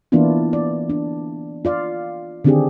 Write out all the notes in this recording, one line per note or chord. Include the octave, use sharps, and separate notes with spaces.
E3 A#3 B3 D4 E4 F4
D5
D4
F4 D5 F5
D3 D#3 C4 D4 G4 G#4